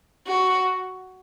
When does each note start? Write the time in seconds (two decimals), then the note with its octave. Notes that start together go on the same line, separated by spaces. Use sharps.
0.27 F#4